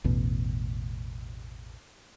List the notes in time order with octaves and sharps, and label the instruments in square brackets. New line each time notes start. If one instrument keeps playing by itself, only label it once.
[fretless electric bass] A1 E2 B2